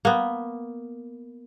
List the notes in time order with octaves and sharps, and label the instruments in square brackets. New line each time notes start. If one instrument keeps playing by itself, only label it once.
[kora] A#3 B3